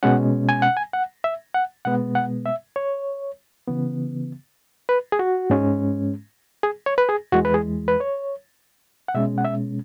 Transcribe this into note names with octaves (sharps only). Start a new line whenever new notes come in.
B2 G#3 C#4 F#5
G#5
F#5
G#5
F#5
E5
F#5
B2 G#3 B3 F#5
F#5
E5
C#5
C#3 E3 B3
B4
G#4
F#4
G#2 G#3 C#4
G#4
C#5
B4
G#4
E2 E3 G#3 F#4
B4
G#4
B4
C#5
F#5
B2 G#3 C#4 E5
F#5
E5